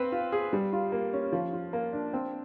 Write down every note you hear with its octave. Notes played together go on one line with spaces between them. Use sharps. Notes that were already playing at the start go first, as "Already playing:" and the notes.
Already playing: C4 B4
F4
G#4
G3
F4
A#3
C#4
F3
F4
A#3
D4
C4